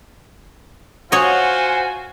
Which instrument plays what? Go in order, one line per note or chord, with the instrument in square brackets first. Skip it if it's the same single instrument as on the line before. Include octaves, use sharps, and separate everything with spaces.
[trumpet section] F4 C5 F#5 [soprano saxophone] F#4 [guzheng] C#5 D#5 [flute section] G#5